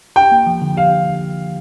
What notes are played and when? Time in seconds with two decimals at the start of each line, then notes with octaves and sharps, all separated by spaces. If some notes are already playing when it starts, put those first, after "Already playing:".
0.16 G4 G5
0.31 A#3
0.47 F3
0.62 D3
0.77 G4 F5